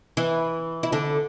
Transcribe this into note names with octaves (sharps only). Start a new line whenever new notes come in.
E3 E4
E4
D3 D4